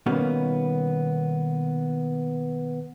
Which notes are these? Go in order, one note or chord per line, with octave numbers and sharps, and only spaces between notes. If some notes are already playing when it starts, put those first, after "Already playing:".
B2 D#3 G3 A#3 B3 C#4